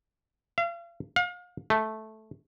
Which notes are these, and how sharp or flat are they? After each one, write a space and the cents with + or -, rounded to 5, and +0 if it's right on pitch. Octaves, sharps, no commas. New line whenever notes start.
F5 -40
F5 +35
A3 -10